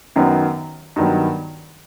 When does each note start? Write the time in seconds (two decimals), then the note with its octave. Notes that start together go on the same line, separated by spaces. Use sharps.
0.16 F#2 D#3 F#3 B3
0.96 G2 D#3 F#3 B3